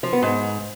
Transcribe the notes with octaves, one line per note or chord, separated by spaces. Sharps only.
F3
B3
G#2